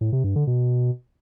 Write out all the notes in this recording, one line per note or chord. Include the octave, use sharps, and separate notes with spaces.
A2
C3
G2
D3
B2